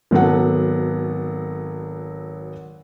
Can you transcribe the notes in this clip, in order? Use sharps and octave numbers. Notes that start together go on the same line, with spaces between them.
G#1 F#3 B3 A4 F#5